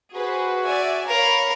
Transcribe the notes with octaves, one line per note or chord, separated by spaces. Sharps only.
F#4 G#4 B4 C5
D5 E5 G#5
A#4 C#5 F5 B5